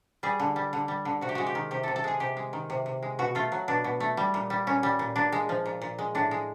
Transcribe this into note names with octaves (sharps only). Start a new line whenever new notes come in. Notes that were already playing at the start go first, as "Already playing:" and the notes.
G3 G#4
D3
G3
D3
G3
D3
C3 F#4
G4
G#3 F#4
G4
D#3
C3 G4
C3 A4
A4
G#3 G#4
C3 G4
G#3
D#3
C3
C3
G#3
B2 F#4
A3 F4
F#3
B2 D4
B2
A3
G3
A#2
G3
A#2 C#4
G3
A#2
A#2 D4
G#3
F3
A#2
A#2
G#3
A2 D4
G#3